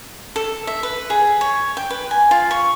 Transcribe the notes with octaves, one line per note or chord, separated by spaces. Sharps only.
A4
E5
B4
G#4
C#5
G5
B4
G#5
F4
C#6